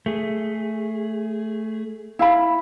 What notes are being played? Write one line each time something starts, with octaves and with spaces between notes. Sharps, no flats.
A3 G#4
E4 F5 B5